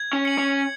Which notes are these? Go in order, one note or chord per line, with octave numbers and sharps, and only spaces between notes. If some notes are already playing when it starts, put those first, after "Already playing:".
Already playing: G#6
C#4
C#7 F#7
C#4